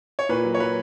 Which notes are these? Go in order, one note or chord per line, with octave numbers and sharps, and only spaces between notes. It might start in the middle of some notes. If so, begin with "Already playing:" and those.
C#5
A#2 B4
F#3
C#5
F#3 B4